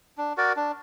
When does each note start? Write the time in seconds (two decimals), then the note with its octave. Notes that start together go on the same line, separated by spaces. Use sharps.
0.18 D4
0.37 F#4 A#4 D5
0.56 D4